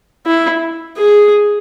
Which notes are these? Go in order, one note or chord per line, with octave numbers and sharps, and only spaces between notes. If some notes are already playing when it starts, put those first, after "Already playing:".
E4
G#4